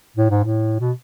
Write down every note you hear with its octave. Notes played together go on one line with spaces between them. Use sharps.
A2
G#2
A2
B2